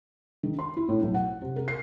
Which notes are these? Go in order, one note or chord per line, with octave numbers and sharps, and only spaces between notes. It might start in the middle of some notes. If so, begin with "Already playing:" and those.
D#3
C6
E4
A2
B1
F#5
C3
A#4
C7